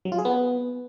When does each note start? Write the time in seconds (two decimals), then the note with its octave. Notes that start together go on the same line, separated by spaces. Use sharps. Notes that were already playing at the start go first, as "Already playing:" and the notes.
0.05 F#3
0.12 F4
0.18 G#4
0.25 B3